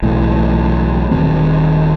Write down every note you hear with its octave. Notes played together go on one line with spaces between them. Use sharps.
B1 A2 E3
D#1 D#3 C4